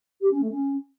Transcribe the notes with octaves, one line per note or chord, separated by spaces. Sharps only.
G4
C#4
A3
C#4